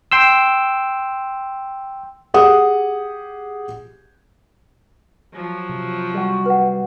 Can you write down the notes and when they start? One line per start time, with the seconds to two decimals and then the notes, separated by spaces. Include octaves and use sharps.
0.12 G5 C6 E6
2.34 G4 G#4 F#5 D#6
5.33 F3 F#3
5.69 C3
6.14 G3 F#4
6.46 B4 F#5